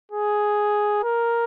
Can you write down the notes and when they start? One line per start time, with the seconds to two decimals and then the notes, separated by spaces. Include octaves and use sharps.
0.12 G#4
1.03 A#4